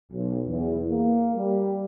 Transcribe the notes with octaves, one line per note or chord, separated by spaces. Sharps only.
B1
E2
A#3
G3